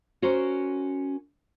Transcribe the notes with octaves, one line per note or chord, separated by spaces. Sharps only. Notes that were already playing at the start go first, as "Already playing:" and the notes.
C#4 F#4 A#4 C5